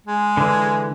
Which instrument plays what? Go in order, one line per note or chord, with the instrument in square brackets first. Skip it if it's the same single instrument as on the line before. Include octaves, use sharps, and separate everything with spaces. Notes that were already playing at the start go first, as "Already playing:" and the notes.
[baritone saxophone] G#3
[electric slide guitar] D3 E3